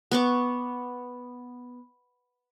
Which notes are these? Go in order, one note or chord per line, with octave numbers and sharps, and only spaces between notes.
B3 C#6 D6